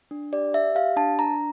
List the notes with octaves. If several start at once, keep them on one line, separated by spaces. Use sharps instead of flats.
D4
G4 D5
G4 E5
G4 F5
D4 A5
D4 A#5